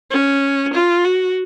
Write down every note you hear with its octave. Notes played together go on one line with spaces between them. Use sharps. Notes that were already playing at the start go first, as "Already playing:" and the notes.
C#4
F4
F#4